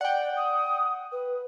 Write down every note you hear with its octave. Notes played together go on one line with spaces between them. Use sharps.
D5 F#5 G5
D#6
B4